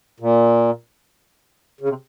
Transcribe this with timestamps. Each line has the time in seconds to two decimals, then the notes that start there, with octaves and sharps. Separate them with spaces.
0.20 A#2
1.81 C#3
1.89 C3